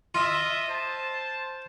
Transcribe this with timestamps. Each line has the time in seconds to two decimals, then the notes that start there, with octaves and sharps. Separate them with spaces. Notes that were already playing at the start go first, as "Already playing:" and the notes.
0.15 F4 D#5 E5
0.69 C5 A5